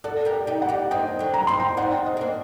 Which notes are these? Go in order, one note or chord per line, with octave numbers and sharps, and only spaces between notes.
F#4 A4 D5
G4 A#4
D5
D#4 G4
D5 F#5
D#4 G4
C4 D#4 D#5 G5
D3 F#3
A#5
C4 D#4 C6
G5 A#5
C4 D#4 D5 F#5
D#5
C4
A#3 D4